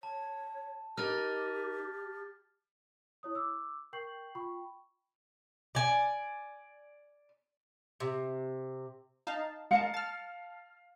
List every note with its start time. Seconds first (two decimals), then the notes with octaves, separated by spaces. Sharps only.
0.03 C#5 A5
0.97 D#4 G4 A#4 D#5 F6 A6
3.23 E4 C#5 D#6
3.35 D6 E6
3.93 A#4 G5 C#6 G6 C7 F#7
4.35 F4 G5 B5 C#6
5.75 D5 G#5
8.00 C3
9.27 D#4 F5 A5
9.71 G#3 A#4 F5 A5 C#7
9.94 A5 F6